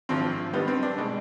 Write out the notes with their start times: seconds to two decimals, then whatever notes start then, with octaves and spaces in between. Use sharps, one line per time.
0.09 G#1 G2 F3 C4
0.53 G2 D#3 G3 B3
0.68 C4
0.83 D4
0.98 B2 G#3